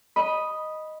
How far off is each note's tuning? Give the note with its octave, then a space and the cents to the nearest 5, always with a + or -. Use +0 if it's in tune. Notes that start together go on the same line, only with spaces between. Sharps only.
D#5 +0 B5 -10